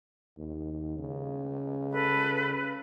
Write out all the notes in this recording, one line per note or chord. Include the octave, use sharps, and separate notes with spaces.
D#2
C#3
A4 B4